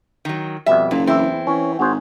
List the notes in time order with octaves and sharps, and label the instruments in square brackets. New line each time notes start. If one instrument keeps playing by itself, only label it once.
[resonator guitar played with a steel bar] D#3 F#3
[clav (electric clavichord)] F2 B2 G3 [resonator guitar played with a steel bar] E5
[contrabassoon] F#1 [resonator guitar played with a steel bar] A#2
[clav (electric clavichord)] E2 E5 [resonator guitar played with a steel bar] C4 E4
[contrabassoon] E3 [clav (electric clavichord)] C#4 C#5
[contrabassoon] G#1 [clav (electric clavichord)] F#4 G#4 C5